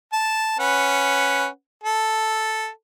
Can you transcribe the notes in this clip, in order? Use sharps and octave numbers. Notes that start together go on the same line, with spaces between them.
A5
C#4 B4 F#5
A4